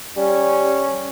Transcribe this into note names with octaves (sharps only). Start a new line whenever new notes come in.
G3 C#4